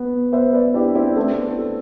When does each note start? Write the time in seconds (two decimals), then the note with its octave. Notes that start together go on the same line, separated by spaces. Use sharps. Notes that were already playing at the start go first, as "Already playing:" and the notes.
Already playing: B3
0.33 B3 C5 E5
0.53 B4 D5
0.74 D4 E4 G4
0.95 C4 E4
1.16 A3 B3 C4
1.59 A4